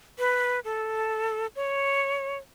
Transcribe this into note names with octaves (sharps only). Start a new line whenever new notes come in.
B4
A4
C#5